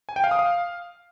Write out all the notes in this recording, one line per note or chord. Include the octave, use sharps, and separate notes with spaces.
G#5
G5
F5
D#6
F5